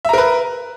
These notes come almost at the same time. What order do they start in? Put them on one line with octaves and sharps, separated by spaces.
E5 A#5 A#4 B4